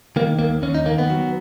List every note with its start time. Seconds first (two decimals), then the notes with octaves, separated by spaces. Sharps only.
0.16 D#3 A#3
0.39 D#2 A#3
0.62 D#2 C#4
0.74 D#4
0.86 D#3 A#3
0.98 B3
1.10 F#3